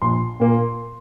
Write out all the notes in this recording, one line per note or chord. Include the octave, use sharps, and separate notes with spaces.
A#1 C6
A#2 A#3